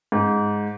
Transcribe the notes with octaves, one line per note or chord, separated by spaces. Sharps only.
G#2